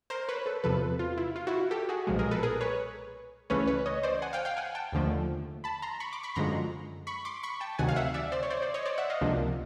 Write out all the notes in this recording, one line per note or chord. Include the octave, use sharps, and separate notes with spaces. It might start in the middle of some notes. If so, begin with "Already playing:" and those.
A#4 C5
B4 C#5
A4 B4
E2 C3 F3 A4 B4
F4
E4
F4
E4 F#4
G4 A4
F#4 G#4
B1 A#2 F3 G#3
G#4 A#4
A4 B4
G#4 A#4
B4 C#5
C#2 C#3 E3 A3 C#4 B4 C#5
B4 C#5
C#5 D#5
C5 D5
F#5 G#5
F5 G5
F5 G5
F#5 G#5
G5 A5
D#2 D3 F3 A3
A5 B5
A#5 C6
B5 C#6
C6 D6
B5 C#6
F#2 D3 F3 G#3 A#5 C6
B5 C#6
C6 D6
B5 C#6
G5 A5
D2 C3 D#3 F#3 F#5 G#5
F5
E5 F#5
D5 E5
C5 D5
C#5
C5 D5
C5 D5
C#5 D#5
C5 D5
E5 F#5
D#5 F5
C#2 C3 F3 A#3 D4